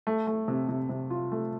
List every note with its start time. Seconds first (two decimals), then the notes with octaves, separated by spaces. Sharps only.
0.07 A3
0.27 A3
0.48 C3
0.69 C3
0.89 C3
1.10 F4
1.32 A3